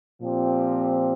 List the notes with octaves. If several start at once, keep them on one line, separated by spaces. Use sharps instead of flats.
A#2 F3 C4 G4